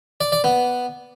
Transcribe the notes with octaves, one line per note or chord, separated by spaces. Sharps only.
D5
D5
B3